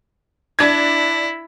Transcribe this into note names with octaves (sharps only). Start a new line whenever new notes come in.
D4 E4 G#6